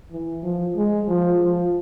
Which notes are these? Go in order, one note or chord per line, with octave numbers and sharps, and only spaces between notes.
E3
F3
G#3
F3
F3